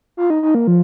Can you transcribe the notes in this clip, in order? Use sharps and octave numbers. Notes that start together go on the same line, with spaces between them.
F4
D#4
D#4
A#3
F3